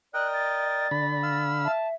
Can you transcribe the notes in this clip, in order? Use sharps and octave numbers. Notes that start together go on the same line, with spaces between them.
A#4 D5 D#5 G5 F#6
A6
D3 B5
F5 E6
E5 A5